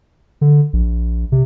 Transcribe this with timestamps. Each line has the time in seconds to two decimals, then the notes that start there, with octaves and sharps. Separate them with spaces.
0.41 D3
0.73 A#1
1.32 C3